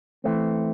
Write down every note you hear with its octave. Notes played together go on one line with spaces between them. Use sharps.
E3 A3 C4